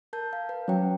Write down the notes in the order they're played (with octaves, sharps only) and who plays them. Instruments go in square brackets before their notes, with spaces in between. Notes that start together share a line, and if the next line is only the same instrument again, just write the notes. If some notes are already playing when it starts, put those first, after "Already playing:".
[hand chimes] A#4 A5 G6
F5
B4
[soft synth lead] F#3 [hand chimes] C#4 G5